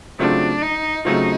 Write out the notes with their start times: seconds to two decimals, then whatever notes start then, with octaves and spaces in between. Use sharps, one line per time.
0.19 C#3 F#3 A3 C4 D4 F4
0.62 D#4
1.05 C#3 F#3 A3 C4 D#4 F4